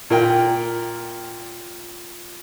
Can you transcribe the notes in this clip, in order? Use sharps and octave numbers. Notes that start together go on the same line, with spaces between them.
A#2 A#4 G5